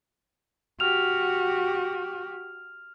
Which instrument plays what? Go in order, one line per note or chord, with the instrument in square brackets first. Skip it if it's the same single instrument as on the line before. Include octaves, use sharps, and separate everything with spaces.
[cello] F#4 G4 [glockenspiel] F6 F7